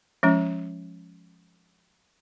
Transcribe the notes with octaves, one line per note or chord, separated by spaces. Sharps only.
F3 G#3 C#4